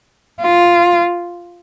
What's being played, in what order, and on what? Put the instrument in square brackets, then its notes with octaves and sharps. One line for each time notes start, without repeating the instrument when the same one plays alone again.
[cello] F4